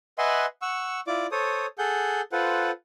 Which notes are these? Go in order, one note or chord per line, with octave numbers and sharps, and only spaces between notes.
B4 D#5 E5 F#5 G#5 C6
F#5 C#6 E6
E4 F4 D5 D6
A4 C5 C#5 D#6
G#4 A4 F#5 G6
F4 A4 B4 C5 F#5